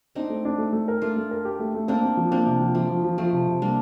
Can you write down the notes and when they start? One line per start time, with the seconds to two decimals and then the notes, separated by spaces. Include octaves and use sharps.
0.15 C4 D4 D#4
0.30 A3
0.45 D4
0.58 A3
0.73 A3
0.88 A#4
1.02 A3 D4 F4
1.16 A3
1.31 A#4
1.45 G4
1.59 A3
1.75 A3
1.88 A#3 C4 D4
2.03 C4
2.17 F3
2.31 A#3 C4 D4
2.46 C3
2.60 F3
2.75 F3 A3 C4
2.89 F3
3.04 F3
3.18 F3 A3 C4
3.33 C3
3.47 C3
3.61 G3 A#3 D4